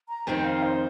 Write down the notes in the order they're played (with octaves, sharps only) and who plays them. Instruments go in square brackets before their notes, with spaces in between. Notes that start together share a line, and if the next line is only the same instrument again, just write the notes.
[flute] A#5
[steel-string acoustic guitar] F2 D#3 C4 D#4 [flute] G5
[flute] F5
C5